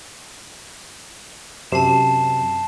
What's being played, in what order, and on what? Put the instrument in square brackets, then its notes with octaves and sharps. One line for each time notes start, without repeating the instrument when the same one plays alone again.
[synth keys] F#2 C3 [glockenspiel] A5 C7 E7